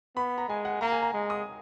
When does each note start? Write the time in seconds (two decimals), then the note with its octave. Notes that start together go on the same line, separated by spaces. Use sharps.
0.16 B3 B5
0.38 A#5
0.48 G#3 G#5
0.65 F#5
0.81 A#3 A#5
0.92 G#5
1.02 A#5
1.13 G#3
1.30 D#6